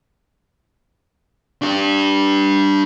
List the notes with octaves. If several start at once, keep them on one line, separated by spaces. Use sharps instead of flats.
D4 G4